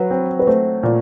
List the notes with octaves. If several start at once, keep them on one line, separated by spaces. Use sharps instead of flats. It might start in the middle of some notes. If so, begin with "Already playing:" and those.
Already playing: F#3 B4
C4
B4
A3 C5
A#2